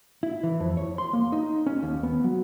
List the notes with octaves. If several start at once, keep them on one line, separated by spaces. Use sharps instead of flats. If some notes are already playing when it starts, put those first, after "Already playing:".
E4
E3
F2
C#5
C6
A#3
D#4
C#4
D#2
B3
F#3